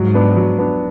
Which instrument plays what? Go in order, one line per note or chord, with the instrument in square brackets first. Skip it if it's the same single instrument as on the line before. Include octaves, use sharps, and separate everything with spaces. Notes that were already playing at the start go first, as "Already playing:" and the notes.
Already playing: [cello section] G#2 [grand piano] F#3
[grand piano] B3 D4
F#3
B3 D4